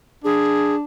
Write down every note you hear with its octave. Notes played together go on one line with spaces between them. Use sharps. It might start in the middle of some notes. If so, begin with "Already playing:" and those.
D4 G#4